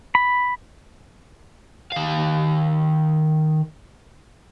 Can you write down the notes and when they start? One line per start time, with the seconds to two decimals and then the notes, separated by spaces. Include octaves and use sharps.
0.15 B5
1.92 D#3 F5